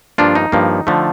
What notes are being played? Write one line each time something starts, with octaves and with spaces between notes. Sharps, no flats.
G2 F3 A#3 D4 F4
D#4
G2 F3 A#3
D3 F3 A3